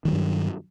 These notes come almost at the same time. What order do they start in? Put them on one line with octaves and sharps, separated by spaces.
D#3 G3 F#3 G2